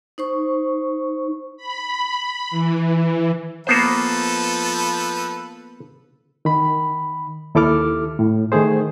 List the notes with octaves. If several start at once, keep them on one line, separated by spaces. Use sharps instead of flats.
D#4 C5 C#6
B5
E3
F3 A#3 B3 A4 B4 C5
D#3 B5
D#2 E4 A4 D6 F6
A2
D#3 A3 G#4 C5